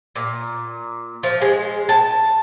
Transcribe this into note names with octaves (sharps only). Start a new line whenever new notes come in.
A#2
F3
G#3
A5